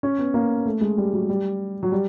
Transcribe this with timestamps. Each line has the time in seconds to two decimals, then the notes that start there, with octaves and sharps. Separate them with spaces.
0.03 C#4
0.18 B3
0.34 A#3
0.65 A3
0.81 G#3
0.97 G3
1.13 F#3
1.29 G3
1.83 F#3
1.92 G3